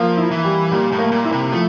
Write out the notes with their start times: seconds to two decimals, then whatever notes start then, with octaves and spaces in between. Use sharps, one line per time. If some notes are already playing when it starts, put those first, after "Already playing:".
Already playing: F3 A#3
0.17 E4
0.31 E3
0.44 G3
0.72 A#2 G3
0.92 A2
0.98 A#3
1.11 A#2
1.25 E4
1.32 C3
1.52 F3 A3